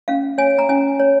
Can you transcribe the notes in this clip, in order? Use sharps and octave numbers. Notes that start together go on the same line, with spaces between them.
C#4 F5
C#5 G#5
A#5
C#4 G#5
C#5